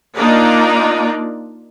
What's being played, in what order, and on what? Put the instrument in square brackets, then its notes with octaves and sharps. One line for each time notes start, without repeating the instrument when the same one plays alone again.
[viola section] A#3 D4 D#4 F4 D5